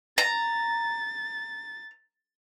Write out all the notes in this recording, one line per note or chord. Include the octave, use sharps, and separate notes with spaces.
A#5 A6